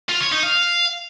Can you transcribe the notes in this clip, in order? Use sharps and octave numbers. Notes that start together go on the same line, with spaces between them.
F4
C#5
D#4
F5